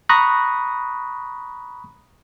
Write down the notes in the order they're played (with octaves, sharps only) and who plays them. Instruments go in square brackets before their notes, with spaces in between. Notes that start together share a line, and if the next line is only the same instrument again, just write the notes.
[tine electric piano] A#5 B5 C#6 D#6 F#6 A#6